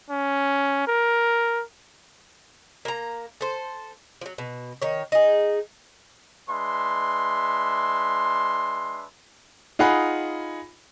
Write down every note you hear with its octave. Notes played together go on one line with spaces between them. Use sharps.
C#4
A#4
A#3 A#5
A4 C5
F3 F#3
B2
D#3 C#5
D#4 G#4
G#3 D4 B4 E5 C6
D#4 F4 G#4 F#5 B5